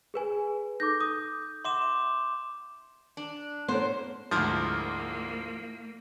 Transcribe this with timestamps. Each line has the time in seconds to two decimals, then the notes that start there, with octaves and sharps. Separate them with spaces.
0.14 G#4 B4 G#5
0.80 D#4 A4 D6 G6 A#6
1.00 D#6
1.65 E5 F#5 C6 D6 E7
3.17 D4
3.68 B3 A#4 C5 C#5
4.31 D2 G#2 F3 A#3 E4 A#4 D5